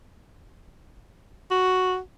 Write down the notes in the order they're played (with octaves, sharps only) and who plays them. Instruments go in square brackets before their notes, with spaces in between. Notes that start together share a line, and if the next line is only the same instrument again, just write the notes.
[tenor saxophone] F#4